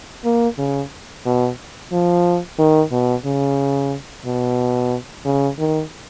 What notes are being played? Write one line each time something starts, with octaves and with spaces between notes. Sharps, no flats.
A#3
C#3
B2
F3
D#3
B2
C#3
B2
C#3
D#3